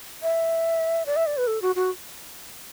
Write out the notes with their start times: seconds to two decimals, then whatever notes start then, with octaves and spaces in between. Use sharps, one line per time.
0.23 E5
1.06 D5
1.16 E5
1.26 D5
1.37 B4
1.47 A4
1.62 F#4
1.76 F#4